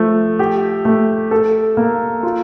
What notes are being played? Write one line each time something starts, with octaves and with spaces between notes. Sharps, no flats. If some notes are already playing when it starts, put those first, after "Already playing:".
Already playing: F3 A3
G4
A3
A4
A#3
F4